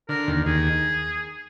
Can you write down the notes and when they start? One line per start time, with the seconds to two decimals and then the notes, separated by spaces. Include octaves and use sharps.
0.09 D3 A#4
0.28 D#2
0.46 D#2 G#4